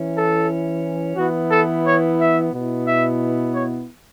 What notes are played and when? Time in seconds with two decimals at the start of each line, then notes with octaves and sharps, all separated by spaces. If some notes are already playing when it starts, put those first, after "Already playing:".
Already playing: E3 C#4 E4
0.15 A4
1.16 E3 B3 E4 F#4
1.50 A4
1.84 C#5
2.18 E5
2.51 B2 B3 E4
2.85 E5
3.52 C#5